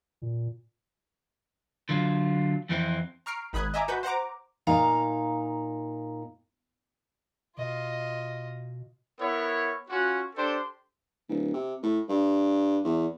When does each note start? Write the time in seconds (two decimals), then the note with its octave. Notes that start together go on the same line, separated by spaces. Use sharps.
0.22 A#2
1.89 D3 F#3 F4
2.69 F2 E3 C4
3.26 A#5 C#6 F6 C7 D7
3.53 G#1 B5 D#6 F#6 G#6
3.74 D#5 E5 G#5 A#5 D6
3.88 F#4 B4 G6
4.03 C5 F#5 A#5 D6
4.67 A#2 D#4 F5 A#5
7.57 B2 F4 D#5
9.20 B3 E4 A#4 C#5
9.89 C#4 F4 F#4
10.36 D4 G4 A4 C5 C6
11.29 D1
11.54 C3
11.83 A2
12.09 G2
12.84 E2